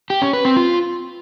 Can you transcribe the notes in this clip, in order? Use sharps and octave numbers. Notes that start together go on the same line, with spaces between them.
G4
C#4
B4
C4
F4